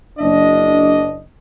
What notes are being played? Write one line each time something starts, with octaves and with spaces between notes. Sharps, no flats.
F#1 D4 D#5